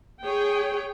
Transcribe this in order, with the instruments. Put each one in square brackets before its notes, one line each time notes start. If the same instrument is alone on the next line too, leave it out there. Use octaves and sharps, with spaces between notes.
[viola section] G#4 C#5 G5